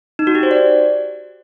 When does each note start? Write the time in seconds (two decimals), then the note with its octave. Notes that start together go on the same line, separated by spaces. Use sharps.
0.19 D#4
0.27 F#4
0.35 G4
0.43 C5
0.51 D5